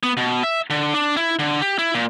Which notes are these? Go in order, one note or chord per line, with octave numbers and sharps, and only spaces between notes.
B3
B2
E5
D3
D4
E4
D3
G4
E4
A#2